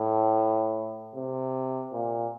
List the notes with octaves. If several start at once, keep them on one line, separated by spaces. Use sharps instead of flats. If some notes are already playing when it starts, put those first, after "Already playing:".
Already playing: A2
C3
A#2